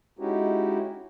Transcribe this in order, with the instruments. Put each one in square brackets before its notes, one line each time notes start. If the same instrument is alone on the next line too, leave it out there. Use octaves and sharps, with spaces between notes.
[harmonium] G#3 C#4 D#4 E4 F#4 G4